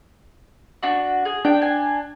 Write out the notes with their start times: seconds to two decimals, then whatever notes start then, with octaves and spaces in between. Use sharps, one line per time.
0.83 D4 F#4
1.25 G#4
1.45 D4 G5
1.62 G#5